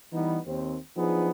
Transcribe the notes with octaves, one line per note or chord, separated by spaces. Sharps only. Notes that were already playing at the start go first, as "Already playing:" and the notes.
E3 G3 B3 D#4
D#2 C4
F3 F#3 B3 D4 D#4 G#4